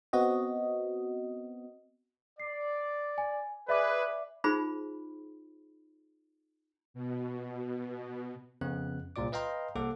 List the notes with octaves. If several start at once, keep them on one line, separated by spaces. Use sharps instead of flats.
B3 C4 F#4 D#5
D5 C7
G#5
G#4 B4 D5 E5 D6
D#4 F4 G#4 C5 B5
B2
F2 C#3 B3 F#6
C2 A#2 F4 D5 D6
B4 D#5 F5 G5 A#5 C6
C2 A#3 A4 F#5 D6